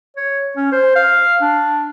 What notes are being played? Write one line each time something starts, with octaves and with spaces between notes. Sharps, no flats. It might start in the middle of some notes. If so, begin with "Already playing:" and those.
C#5
C#4
C5
F5
D4